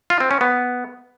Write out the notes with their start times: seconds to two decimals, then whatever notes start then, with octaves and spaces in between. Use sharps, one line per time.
0.10 F4
0.20 C4
0.31 C#4
0.41 B3